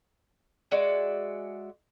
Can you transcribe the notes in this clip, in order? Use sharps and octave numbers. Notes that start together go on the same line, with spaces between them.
G#3 F#4 D5 E5